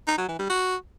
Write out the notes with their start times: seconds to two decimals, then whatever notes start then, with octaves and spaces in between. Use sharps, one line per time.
0.08 D#4
0.18 F#3
0.29 E3
0.39 G3
0.50 F#4